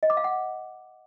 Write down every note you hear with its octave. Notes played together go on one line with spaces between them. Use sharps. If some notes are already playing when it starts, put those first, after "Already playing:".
D#5
D6
F5
F#5